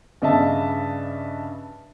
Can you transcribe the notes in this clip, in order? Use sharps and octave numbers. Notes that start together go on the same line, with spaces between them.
G2 C#3 D#5 E5 A5